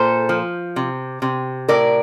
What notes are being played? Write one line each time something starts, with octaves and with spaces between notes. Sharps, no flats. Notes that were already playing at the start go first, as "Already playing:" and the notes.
Already playing: A#2 A4 C5
F3
C3
C3
A2 A#4 D5